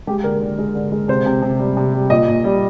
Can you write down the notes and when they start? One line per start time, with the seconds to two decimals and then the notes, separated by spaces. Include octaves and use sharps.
0.07 G#3 G4
0.24 D3 A#4
0.41 D3
0.58 G#3
0.75 D3
0.92 G#3
1.08 C3 C5
1.26 C3
1.42 C3
1.59 G3
1.77 C3
1.94 G3
2.10 A#2 D#5
2.28 A#2
2.44 G3